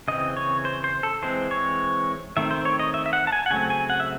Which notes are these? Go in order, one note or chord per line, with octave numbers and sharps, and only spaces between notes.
C#3 E3 C4 D#5
C#5
C5
C5
A4
E3 G#3 C4 C5
C#5
D#3 A3 C4 E5
C5
C#5
D#5
E5
E5
F#5
A5
G#5
F#5
C#3 F#3 A3 C4 G#5
G#5
F#5
E5